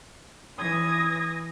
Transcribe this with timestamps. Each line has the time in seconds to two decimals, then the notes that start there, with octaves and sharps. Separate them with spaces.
0.58 E3 D#6 G#6 A#6